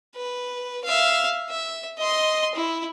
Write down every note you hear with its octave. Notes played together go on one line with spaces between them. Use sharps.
B4
E5 F5
E5
D#5 C6
E4